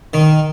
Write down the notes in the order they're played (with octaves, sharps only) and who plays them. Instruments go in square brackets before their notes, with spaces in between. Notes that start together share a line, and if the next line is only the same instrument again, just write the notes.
[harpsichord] D#3